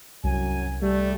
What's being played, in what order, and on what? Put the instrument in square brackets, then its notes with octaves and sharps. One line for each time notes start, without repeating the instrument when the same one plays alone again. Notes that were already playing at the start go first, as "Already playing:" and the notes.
[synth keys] C2 [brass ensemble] F#2 F#3 G#5
[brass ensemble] G3 A3